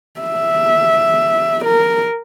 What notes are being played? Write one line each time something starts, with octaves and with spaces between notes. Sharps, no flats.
E5
A#4